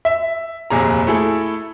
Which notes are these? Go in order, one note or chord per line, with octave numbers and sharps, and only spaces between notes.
E5
F1 D#2 A#2 G#4 A#5
A3 E4 G#4 A4